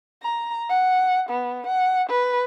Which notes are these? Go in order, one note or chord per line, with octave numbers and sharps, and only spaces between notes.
A#5
F#5
B3
F#5
B4